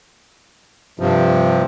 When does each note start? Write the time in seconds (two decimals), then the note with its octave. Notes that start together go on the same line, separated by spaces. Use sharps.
1.00 G2 C3 F3